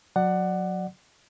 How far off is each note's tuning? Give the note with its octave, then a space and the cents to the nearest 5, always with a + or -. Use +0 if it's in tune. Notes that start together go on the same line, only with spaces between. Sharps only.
F#3 -15 D5 +20 F#5 +10